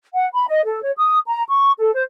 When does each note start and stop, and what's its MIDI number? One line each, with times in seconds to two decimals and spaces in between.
0.14 0.28 78
0.35 0.45 83
0.48 0.64 75
0.65 0.81 69
0.83 0.92 73
0.97 1.19 87
1.27 1.43 82
1.48 1.71 85
1.80 1.93 69
1.94 2.03 72